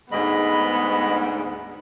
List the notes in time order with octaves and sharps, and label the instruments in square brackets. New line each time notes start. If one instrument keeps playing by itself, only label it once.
[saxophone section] D2 G#2 [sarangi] B3 [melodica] D#5 B5